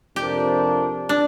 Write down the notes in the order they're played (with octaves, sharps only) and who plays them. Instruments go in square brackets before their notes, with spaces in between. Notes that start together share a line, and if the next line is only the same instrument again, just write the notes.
[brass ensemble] F2 C3 F3 D4 A#4 [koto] G4
[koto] D4